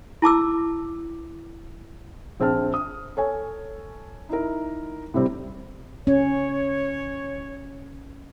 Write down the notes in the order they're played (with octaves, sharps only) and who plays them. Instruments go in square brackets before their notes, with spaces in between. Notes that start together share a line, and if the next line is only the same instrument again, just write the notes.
[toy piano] E4 A5 D6 E6
[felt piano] A#1 C4 G#4 A5 F6
D#6
A4 C#5 G#5
D#4 E4 A#4
A2 C3 G3 C4
[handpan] C#4 [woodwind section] C#5